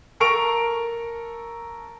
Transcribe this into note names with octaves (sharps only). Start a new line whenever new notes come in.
A4 A#4 A#5 C#6 D7 F7